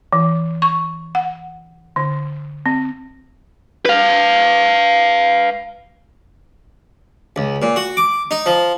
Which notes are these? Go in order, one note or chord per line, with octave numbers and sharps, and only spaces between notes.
E3
C#6
F#5
D3
C4
B4 F5
C#2
A#2
F#4
D6
D#4
F3